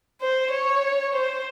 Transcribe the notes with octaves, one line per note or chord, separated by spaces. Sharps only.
C5
C#5
C5